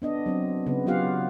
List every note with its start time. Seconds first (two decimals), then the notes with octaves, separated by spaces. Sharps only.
0.02 B3 D4 D#5
0.26 F#3 C4
0.66 C#3 B3
0.87 F#3 B3 F4 G4 F5 F#5